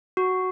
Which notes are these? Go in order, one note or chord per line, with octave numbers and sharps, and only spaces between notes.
F#4